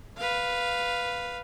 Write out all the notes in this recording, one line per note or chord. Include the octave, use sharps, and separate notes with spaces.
B4 F5